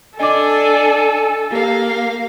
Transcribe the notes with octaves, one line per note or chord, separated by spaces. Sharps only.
D4 A4 D5 D#5 G#5 D6
A#3 G4 F5